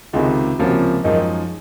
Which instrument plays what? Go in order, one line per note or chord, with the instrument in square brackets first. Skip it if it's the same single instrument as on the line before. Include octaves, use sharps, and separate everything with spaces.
[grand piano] C#2 C3 D#3 [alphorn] G#3
[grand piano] C#2 C3 F3 A#3 C#4 [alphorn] F#3
[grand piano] F#2 F3 G#3 D#4 [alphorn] D#3